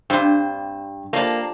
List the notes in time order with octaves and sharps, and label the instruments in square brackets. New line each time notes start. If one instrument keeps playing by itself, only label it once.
[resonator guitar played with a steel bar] G2 [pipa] C4 G4 C5
[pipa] F3 G3 D4 [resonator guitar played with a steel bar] A#3